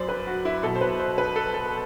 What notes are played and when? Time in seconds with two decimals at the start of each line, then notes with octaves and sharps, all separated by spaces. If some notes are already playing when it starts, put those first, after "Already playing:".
Already playing: F#2 F#3 C5 D5
0.09 B4
0.27 F#4
0.45 E4
0.63 B2 F#3 A4
0.76 C5
0.81 B4
1.00 C5
1.18 B4
1.36 A4
1.54 A4